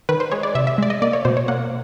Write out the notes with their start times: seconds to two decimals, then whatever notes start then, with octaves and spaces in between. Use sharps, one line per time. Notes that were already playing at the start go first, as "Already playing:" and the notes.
0.09 D#3 B4
0.20 C5
0.31 G#3 C#5
0.43 D5
0.55 C3 E5
0.67 E5
0.78 G#3 D5
0.90 D#5
1.02 A#3 D5
1.13 C#5
1.25 B2 C5
1.37 C#5
1.48 A#3 F#5